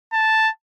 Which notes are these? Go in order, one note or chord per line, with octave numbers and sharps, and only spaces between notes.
A5